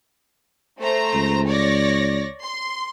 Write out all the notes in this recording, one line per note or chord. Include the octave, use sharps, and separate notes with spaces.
A3 C5 A#5
C#2
C#5 D5 A#6
C6